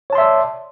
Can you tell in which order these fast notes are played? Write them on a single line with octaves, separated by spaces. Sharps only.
C#5 A5 C6 E5 D5